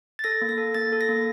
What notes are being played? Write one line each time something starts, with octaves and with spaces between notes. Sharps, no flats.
A6
A4 A#6
A#3
A#6
A4
A#3 A6
A4
A#6
A#3